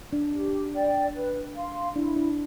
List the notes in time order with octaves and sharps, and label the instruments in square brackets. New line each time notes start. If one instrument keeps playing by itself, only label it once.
[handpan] D4
[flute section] G4
D5 G5
B4
F5 C6
[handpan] D4 [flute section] E4
[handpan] D4